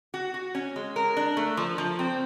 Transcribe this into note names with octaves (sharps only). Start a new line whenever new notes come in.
F#4
F#4
C#4
G#3
A#4
D4
A3
F3
F3
C4